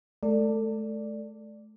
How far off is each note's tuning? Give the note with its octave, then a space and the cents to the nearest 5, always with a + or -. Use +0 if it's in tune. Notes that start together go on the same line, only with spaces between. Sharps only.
A3 -35 A4 +30 D5 +0